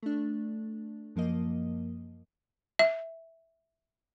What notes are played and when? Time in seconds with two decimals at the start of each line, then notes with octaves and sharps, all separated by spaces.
0.03 A3 D4
1.16 F#2 F3 A#3 D#5
2.79 E5